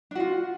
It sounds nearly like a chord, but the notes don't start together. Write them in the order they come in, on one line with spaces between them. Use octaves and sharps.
D4 F#4 F4